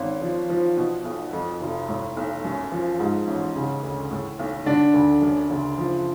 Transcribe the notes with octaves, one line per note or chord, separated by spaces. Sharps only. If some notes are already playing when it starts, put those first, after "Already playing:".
Already playing: G#1 C#4
F3
F3
B2
B1
F2
F1
A2
B1
F#2
F3
G#2
A1
C#3
D2
A2
B1
D3 D4
D2
F#2
F#1
F3